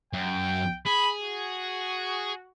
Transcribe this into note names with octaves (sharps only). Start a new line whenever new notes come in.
F#2 G5
G#4 B5
F#4